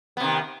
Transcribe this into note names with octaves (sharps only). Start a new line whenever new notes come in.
C3 D#3 B3